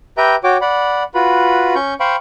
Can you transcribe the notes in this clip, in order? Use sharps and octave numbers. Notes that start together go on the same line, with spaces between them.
G4 B4 E5 G5 A#5 G6
F#4 C#5 G5 D6
D5 F#5 B5
F4 F#4 B4 B5
C#4 C#6 G6
C5 F5 G5 B5 C#6